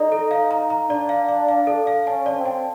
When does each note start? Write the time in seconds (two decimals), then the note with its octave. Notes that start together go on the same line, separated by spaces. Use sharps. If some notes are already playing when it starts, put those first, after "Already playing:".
Already playing: D#4 A4 D5
0.12 A4
0.31 F5
0.51 A#5
0.70 A#5
0.90 D4 D5
1.09 F5
1.29 F5
1.48 F5
1.67 A4
1.87 F5
2.06 C#4 A5
2.26 D5
2.35 C4
2.46 A5